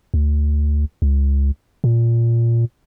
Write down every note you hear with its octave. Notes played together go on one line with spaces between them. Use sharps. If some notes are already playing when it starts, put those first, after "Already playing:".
D2
C#2
A#2